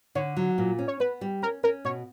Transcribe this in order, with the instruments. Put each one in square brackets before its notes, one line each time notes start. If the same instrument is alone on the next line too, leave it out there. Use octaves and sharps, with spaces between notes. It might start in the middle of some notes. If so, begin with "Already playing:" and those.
[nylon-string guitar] D3 [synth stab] C#5
[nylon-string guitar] F#3
A#2
C#4
[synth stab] C#5
[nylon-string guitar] B3 [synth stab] B4
[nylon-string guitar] G3
[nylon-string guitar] C#4 [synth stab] A#4
[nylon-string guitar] C#4 [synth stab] A#4
[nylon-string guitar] B2 [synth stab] C#5